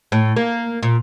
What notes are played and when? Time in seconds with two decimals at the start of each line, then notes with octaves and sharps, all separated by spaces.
0.12 A2
0.37 A#3
0.83 A#2